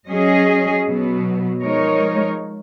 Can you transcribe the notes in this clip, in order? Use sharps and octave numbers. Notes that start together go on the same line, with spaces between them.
F#3 C#4 G#4 D#5
B2 F#3 B3
F3 G#3 D#4 A#4 C#5